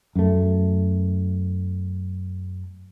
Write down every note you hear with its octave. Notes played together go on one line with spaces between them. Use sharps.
F#2 A3